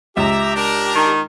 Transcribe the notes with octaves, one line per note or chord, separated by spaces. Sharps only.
C#2 G4 E5 A#5
D4 A#4
D#3